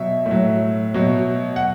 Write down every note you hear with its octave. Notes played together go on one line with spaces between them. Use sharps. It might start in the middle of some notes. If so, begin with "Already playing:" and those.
Already playing: B2 F#3 E5
A2
F#3
B2 F#3
F#5